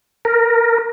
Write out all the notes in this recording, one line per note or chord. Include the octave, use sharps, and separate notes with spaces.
A#4